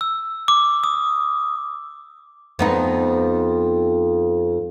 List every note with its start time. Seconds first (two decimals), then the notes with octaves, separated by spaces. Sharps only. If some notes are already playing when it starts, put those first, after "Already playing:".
0.01 E6
0.48 D6
0.84 D#6
2.59 F2 B3 D#4